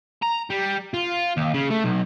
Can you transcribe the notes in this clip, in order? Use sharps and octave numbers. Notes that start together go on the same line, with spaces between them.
A#5
G3
F4
D#2
C#3
A3
B1